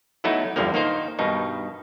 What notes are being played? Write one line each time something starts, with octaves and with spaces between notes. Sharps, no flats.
E3 F#3 A3 B3 D#4 E4
B1 E2 G2 D3 F3 A#3
D#3 A#3 D#4 C5
G2 B2 D#3 D#4